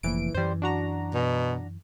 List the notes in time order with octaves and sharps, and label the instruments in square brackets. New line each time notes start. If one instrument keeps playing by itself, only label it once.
[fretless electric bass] F1 A#3 [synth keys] A#1 E3 D7
[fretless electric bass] F#2 E3 [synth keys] G3 C5
[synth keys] D4 F#4 A#5
[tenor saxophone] B2